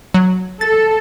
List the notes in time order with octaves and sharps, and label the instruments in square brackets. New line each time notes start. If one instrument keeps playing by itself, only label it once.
[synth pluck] F#3
[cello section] A4 [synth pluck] A6